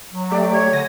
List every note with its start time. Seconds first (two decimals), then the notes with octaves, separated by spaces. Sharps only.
0.13 F#3
0.32 A3 G4 D5
0.54 C#5 G#6
0.73 D3 G#5 A#6